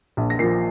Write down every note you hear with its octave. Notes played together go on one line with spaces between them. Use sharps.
A#1
A#6
A#2 F3 C7